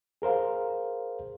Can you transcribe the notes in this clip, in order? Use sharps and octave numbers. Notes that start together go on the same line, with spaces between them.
G#4 A#4 C5 F5